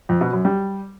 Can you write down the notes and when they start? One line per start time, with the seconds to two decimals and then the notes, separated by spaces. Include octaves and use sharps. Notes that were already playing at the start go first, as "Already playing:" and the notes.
0.09 F2
0.21 B2
0.33 F#2
0.45 G3